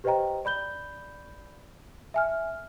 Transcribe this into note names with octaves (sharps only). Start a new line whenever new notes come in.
G4 B4 C5 D#5 G5 A#5
D5 B5 G6 G7
E5 G#5 F6